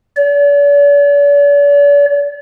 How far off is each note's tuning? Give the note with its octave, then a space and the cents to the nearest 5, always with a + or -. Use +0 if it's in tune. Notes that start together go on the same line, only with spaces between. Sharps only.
D5 -45